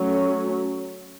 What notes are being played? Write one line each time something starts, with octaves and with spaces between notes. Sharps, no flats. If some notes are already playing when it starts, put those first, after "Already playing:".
Already playing: F#3 A3 C#4